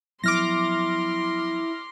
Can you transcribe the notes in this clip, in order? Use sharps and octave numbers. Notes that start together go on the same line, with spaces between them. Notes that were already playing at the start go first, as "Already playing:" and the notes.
F3 F#3 B3 E4 C6 D6 F6 A#6